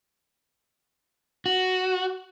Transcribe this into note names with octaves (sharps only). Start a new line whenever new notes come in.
F#4